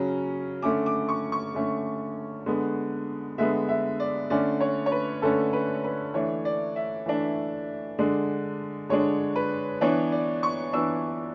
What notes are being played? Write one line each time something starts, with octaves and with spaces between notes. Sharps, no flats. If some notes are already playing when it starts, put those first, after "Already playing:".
Already playing: C#3 F#3 C#4
D3 A3 C#4 D6
D6
C#6
C#6
D3 A3 C#4
D3 G#3 B3
D3 G#3 B3 E5
E5
D5
D3 A3 C#4 D5
C#5
C#5
B4
D3 A3 C#4 A4
B4
B4
E3 A3 D4 C#5
D5
E5
E3 A3 D4
D3 G#3 D4
D3 G#3 D4 C#5
B4
E3 B3 D4 C#5
D5
C#6
E3 B3 D4 E6